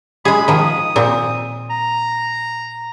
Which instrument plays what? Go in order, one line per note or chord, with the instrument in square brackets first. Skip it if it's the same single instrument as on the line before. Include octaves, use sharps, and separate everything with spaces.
[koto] G#3 G#4 [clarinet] B5
[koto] D#3 F3 [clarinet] D#6
[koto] A#2 C4
[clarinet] A#5